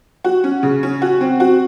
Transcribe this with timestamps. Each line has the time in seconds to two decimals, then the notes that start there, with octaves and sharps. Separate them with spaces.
0.24 F#4
0.44 C#4
0.63 C#3
0.83 C#4
1.02 F#4
1.21 C4
1.40 F#4